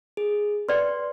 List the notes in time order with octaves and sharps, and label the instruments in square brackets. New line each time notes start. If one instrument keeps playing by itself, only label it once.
[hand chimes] G#4
[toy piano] B4 D5 G5 [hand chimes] C6